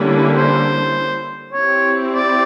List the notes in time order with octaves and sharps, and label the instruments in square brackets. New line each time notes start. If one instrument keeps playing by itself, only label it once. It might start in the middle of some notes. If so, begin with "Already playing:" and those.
Already playing: [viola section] D3 G3 A#3 C#4 E4
[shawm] C5
[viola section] C4 E4 G4 [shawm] C#5
[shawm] D5